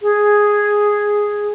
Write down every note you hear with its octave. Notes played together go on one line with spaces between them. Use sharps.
G#4